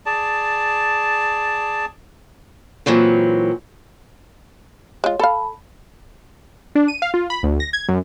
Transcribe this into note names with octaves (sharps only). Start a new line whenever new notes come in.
G#4 D5 A5
A#2 E3 F#3 C4
G#3 F4 C#5
A4 F5 A5 B5
D4
D#7
F5
F4
B5
D2
A#6
G#6
F#2